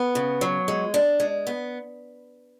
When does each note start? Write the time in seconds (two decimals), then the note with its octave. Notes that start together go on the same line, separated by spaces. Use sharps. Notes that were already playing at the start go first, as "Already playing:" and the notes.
Already playing: B3
0.15 C#3
0.41 F#3
0.68 G#3
0.94 D4
1.20 G#3
1.47 B3